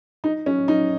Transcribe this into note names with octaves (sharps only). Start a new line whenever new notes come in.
D#4
C#4
D#4